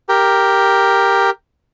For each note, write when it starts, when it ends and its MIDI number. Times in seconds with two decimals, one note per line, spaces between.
0.09 1.30 67
0.09 1.30 70